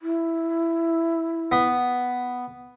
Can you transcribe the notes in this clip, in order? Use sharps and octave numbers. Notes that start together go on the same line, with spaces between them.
E4
B3